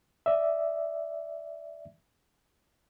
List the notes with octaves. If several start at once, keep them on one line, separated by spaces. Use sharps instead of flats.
D5 E5